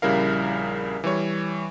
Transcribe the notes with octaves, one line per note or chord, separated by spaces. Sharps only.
A#1 C#3 G3 E4 A#4 F5
E3 G3 C#5